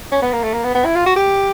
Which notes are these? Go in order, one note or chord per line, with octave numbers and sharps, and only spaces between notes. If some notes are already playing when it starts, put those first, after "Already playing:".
C#4
B3
A#3
A3
A#3
B3
B3
E4
F4
F#4
G4